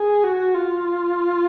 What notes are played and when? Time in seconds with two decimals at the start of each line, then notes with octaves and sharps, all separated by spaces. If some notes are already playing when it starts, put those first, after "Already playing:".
Already playing: G#4
0.24 F#4
0.55 F4